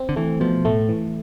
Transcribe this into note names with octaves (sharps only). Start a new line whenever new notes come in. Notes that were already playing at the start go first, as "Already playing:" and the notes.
Already playing: C4
D3
E3 A3
B2 F3
A2 A3
E3